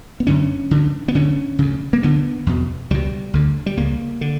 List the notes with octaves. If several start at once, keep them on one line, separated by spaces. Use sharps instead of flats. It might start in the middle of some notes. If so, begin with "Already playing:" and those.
B3
F#2 D3 C#4
D2 D3
B3
D2 D3 C#4
D2 C#3
A#3
D2 D3 B3
E2 B2
C#2 B2 G3
D2 D3
G3
C#2 C#3 A#3
D3